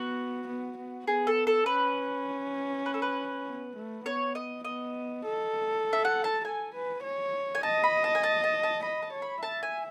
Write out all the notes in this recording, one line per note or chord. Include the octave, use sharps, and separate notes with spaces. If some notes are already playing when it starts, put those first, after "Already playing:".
Already playing: B3 F#4
B3
B3
B3 G#4
A4
A4
C#4 B4
B4
A4
B4
B3
A3
B3 C#5
D#5
B3 D#5
A4
E5
F#5
A5
A4 G#5
B4
C#5
G#5
D#5 A5
B5
A5
G#5
A5
A5
A5
D#5 B5
A5
C#5
B5
E5 A5
G#5